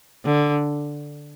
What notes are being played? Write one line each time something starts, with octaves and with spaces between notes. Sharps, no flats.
D3